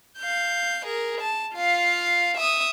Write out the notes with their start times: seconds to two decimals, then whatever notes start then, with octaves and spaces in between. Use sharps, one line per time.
0.18 F5 G6
0.85 G#4 A#4
1.21 A5
1.54 F4 F5
2.37 E5 D#6